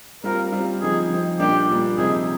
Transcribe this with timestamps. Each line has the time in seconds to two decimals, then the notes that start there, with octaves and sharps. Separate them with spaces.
0.24 G3 C4 F4 A#4
0.52 G3 C4 F4
0.81 F3 C4 D#4 G#4
1.10 F3 C4 D#4
1.39 A#2 G3 A#3 D4 G4
1.69 A#2 G3 A#3 D4
1.97 C3 F3 C4 D#4 G#4